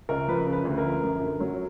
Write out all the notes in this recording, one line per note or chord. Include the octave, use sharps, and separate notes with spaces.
C#2 A#4
F3 B4
C#3
B4
D2
A#4
F3
F#2
D3
F#3